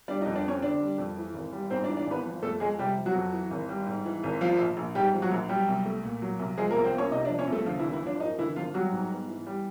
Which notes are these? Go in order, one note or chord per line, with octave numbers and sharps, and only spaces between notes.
G3 D4 D5
D#4 D#5
F2
D4 D5
C4 C#4 C#5
D3 D4 D5
G3
F2
E3
G#1
G3
G#2 C4 C5
D4 D5
E3
D4 D5
G#1 B3 B4
F3
F2 A3 A4
F2 G#3 G#4
C3 G3 G4
F3
F#3 F#4
F2
E3
G#1
G3
G#2
E3
G#1
F3 F4
A#1
A#1
G#2 G3 G4
F3
F#3 F#4
A#1
F#3 G3 G4
C2
A3
A#2
F#3
C2
F3 G#3 G#4
A#3 A#4
C2
C4 C5
A#3 C#4 C#5
C3 D#4 D#5
D4 D5
F3
C#4 C#5
C2
A3 A4
D3 F3 F4
E3 E4
G#1
E3 E4
F3 D4
F#2 D#4
D3 E3 E4
G#1 F3 F4
F#3 G3 F#4
G#2
B3
E3
G3